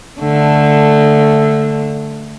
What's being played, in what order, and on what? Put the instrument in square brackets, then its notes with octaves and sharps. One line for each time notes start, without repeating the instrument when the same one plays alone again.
[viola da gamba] D3 A3